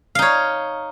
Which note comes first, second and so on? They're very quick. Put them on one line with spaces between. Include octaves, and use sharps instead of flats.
F5 D#4 C#5